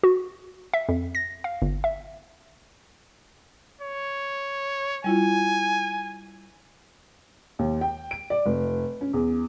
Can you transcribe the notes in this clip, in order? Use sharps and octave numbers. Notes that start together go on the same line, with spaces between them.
F#4
E5
F2
A#6
F5
G1
E5
C#5
G3 E4 F4 G#5
D#2
G5
D7
D5
F1
C#4
E2